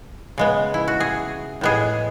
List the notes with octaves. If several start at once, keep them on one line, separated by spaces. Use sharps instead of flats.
C#3 G#3 B3
E4
F#4
G#4
A2 G#3 B3 G#4